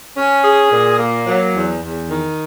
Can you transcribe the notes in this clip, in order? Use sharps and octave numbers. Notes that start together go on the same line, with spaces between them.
C#4
G#4
A#2
A#3
F#3
E2
E2
D#3